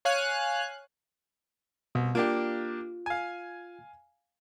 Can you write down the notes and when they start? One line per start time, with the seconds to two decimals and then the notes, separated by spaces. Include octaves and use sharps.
0.05 C#5 F5 G#5 F#6
1.95 C2 B2
2.15 A#3 D4 F4 G4
3.06 F5 G#5